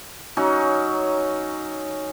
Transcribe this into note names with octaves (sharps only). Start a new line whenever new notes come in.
F#3 C#4 D#4